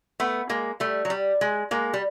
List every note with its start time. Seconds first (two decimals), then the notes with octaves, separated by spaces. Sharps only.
0.20 A3 B3
0.50 G#3 A#3
0.80 G3 A3
1.05 F#3
1.10 G3
1.41 G#3
1.71 G#3 A#3
1.94 G3